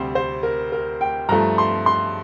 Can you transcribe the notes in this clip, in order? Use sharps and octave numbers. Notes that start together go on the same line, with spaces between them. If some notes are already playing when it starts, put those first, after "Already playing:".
Already playing: D2 C3 G3 C4 C5
C5
A#4
A#4
G5
G2 F3 A3 A#5
C6
C6